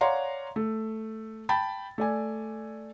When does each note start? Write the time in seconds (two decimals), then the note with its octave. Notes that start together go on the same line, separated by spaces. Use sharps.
0.01 C#5 D5 F5 F#5 A#5 C6
0.56 A3
1.49 G5 A5 B5 A6
1.98 A3 D5 G#5